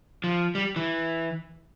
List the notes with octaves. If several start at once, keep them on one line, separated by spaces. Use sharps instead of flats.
F3
G3
E3